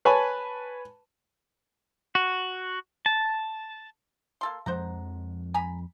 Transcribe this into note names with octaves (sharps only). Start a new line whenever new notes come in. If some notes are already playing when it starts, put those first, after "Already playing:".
B4 C#5 G#5 A5 B5
F#4
A5
A#3 A4 C6
F2 F3 G#3 C5 F#5 A#5
G#5 A#5 B5